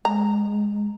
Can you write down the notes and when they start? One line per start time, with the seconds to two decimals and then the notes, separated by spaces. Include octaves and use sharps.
0.05 G#3 A#5